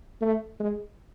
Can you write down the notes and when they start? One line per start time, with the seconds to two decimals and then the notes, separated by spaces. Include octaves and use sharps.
0.21 A3
0.59 G#3